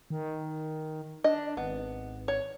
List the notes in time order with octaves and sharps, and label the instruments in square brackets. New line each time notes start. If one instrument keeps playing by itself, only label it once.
[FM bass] D#3
[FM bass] D4 [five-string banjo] D#5
[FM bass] G#1 [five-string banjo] B3
[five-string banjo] C#5